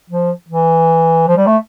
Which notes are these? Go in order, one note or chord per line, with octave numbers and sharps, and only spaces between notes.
F3
E3
F3
G3
A3